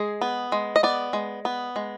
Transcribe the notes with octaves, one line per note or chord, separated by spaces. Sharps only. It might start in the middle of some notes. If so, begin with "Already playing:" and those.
Already playing: G#3 G#4
B3
G#3
D#5
B3 D5
G#3
B3
G#3